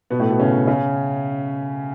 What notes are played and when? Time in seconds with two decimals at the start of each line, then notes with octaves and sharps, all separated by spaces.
0.10 B2 B3
0.20 A2 A3
0.29 B2 B3
0.39 C#3 C#4
0.67 C#3 C#4